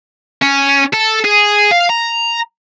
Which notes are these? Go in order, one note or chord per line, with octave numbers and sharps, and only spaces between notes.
C#4
A4
G#4
F5
A#5